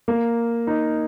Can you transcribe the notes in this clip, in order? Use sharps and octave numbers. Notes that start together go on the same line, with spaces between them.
A#3
D#4